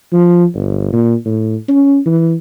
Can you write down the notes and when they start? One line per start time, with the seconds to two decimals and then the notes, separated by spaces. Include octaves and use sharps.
0.13 F3
0.55 G1
0.93 A#2
1.25 A2
1.68 C#4
2.06 E3